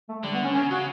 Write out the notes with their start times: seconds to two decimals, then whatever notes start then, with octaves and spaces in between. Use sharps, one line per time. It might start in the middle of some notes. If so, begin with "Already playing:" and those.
0.09 A3
0.23 D3 G3
0.34 B3
0.44 C#4
0.55 C#3 C#4
0.71 C#3 F#4